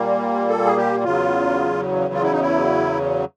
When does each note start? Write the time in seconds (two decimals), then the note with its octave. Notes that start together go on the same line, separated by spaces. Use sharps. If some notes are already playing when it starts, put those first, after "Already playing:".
Already playing: A#2 G3 A#3
0.49 A4
0.65 G#4
0.77 G4
1.04 E2 C#3 F#3 F4
2.14 F4
2.23 E4
2.32 D#4
2.40 E4